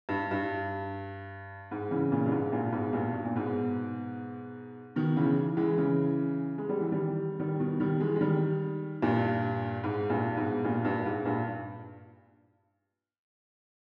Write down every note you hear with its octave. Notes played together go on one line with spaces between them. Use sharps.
G2
G2
G#2
C#3 E3
A#2 C#3
G2
G#2
G2 A#2
G#2 B2
G2 A#2
B2
A#2
G#2 B2
B2 D#3
C#3 E3
E3 G#3
C#3 E3
G#3
G3
E3
D#3 G3
D#3 G3
B2 D#3
D#3 G3
E3 G#3
G#3
D#3 G3
G2 A#2
G#2
G2 A#2
G#2 B2
G2 A#2
G2 A#2
G2
G#2
G2 A#2